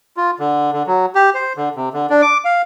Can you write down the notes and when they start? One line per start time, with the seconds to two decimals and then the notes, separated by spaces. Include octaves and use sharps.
0.17 F4
0.39 D3
0.72 D3
0.87 F#3
1.15 G4
1.35 C5
1.57 D3
1.75 C3
1.94 D3
2.10 D4
2.22 D6
2.45 F5